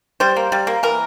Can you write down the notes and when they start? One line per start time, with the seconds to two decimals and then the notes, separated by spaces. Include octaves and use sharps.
0.20 G3 C5
0.36 A#3
0.52 G3
0.67 A#3
0.83 E3 A#4